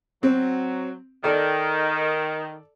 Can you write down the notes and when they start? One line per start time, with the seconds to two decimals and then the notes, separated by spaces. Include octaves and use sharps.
0.23 F#3 C4
1.24 D#3 A4 D5